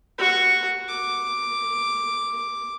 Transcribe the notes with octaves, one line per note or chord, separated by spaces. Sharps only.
F#4 C#6
D6